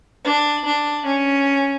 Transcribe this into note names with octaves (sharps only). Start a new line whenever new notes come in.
D4
D4
C#4